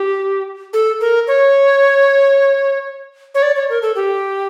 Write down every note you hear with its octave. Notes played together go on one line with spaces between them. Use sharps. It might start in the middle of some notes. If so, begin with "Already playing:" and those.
Already playing: G4
A4
A#4
C#5
C#5
D5
C#5
A#4
A4
G4